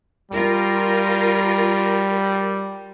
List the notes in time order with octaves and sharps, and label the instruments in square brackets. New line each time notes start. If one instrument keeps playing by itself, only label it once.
[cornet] G3 [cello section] F4 A#4